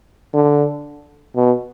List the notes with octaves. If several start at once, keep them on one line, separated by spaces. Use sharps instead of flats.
D3
B2